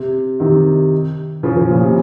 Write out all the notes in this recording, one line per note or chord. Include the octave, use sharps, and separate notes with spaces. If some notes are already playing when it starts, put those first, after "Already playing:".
Already playing: C3
C3 D#3
C#3 F3
C#3 F3
A#2 C#3
C3